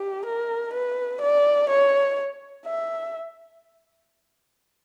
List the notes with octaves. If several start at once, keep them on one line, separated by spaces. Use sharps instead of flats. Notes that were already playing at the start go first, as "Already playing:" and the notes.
Already playing: G4
A#4
B4
D5
C#5
E5